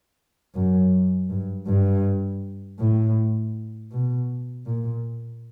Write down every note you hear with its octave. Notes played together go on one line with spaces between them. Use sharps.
F#2
G2
G2
A2
B2
A#2